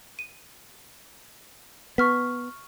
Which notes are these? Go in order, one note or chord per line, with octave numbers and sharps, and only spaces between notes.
D#7
B3 C#6 F6 B6